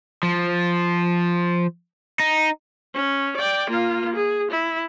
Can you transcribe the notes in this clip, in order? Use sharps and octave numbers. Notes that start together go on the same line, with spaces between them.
F3
D#4
C#4
D5 G5
A#3 F4
G#4
E4